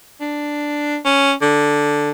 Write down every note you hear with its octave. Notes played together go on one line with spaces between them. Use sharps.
D4
C#4
D3